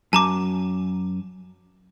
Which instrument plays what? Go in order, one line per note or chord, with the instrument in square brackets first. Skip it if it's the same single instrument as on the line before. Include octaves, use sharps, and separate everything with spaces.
[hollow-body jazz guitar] F#2 [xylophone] A5 A#5 D6